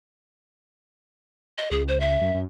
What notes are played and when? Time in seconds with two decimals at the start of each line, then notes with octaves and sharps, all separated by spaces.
1.58 D#5
1.71 C#2 G#4
1.88 C5
2.00 E5
2.21 F#2
2.34 F#2